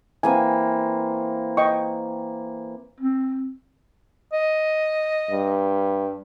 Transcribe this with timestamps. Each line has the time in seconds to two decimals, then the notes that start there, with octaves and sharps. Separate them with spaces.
0.23 E3 A#3 C4 G#5
1.57 D#5 G5 C#6
3.00 C4
4.32 D#5
5.31 G2